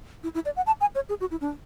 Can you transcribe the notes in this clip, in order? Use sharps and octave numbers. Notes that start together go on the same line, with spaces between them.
E4
E4
D5
F#5
A5
G#5
C#5
G#4
F#4
E4
D4